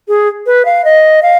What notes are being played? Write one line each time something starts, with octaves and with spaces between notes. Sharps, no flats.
G#4
B4
F5
D#5
F5